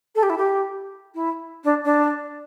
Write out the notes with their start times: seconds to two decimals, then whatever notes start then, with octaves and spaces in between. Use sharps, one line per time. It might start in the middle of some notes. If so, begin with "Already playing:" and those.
0.15 A4
0.22 G4
0.29 E4
0.37 G4
1.14 E4
1.64 D4
1.84 D4